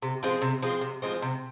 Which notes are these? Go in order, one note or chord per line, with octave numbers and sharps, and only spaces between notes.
C3
F3 G#3 C4
C3
F3 G#3 C4
C3
F3 G#3 C4
C3